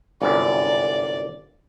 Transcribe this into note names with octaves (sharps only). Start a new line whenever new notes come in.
G1 C2 F#2 D5